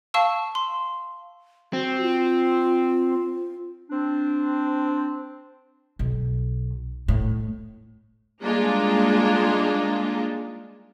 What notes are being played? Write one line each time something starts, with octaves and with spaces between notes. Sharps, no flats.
F5 A5 C#6 E6
C6
C4 F#4
F4
C4 D4
B1
A2
G3 G#3 A#3 D4 D#4 F4